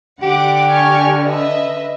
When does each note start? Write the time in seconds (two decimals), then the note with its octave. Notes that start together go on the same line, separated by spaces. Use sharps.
0.22 D3 G4 F#5 D6
0.70 G#5 C#6 F6
1.23 B4 D#5 E5